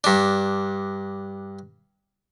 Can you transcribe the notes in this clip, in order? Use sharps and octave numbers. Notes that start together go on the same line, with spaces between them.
G2 D4